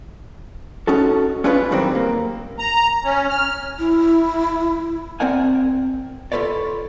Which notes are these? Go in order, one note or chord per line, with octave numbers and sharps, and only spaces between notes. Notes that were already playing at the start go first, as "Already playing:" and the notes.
C#4 D#4 F#4 A4
C#4 D4 F4 G#4 B4 C#5
F#2 A#2 D#3 G3 A#3 C4
A#3
A#5
C#4
F6
E4
C4 A#4 D5 F#5 G#5
F4 A4 B4 C#5 D5